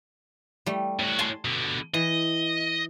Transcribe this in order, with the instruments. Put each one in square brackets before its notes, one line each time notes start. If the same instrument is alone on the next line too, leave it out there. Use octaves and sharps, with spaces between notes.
[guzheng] G3 A3
[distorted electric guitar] A2 F#4
[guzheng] G#5 A5 C6
[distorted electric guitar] B2 D3
[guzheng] E3 [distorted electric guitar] D#5